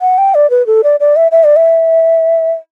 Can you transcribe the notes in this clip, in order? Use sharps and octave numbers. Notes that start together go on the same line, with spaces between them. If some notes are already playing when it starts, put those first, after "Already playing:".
F#5
G5
D5
B4
A4
D5
D5
E5
E5
D5
E5